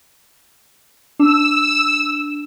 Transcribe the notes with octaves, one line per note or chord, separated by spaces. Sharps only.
D4 E6